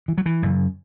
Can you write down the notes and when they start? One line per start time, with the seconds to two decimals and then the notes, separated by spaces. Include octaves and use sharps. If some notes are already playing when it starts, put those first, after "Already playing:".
0.08 E3
0.18 F#3
0.26 E3
0.42 F#2 C#3